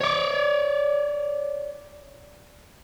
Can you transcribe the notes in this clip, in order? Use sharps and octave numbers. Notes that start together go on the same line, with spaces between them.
C#5 D5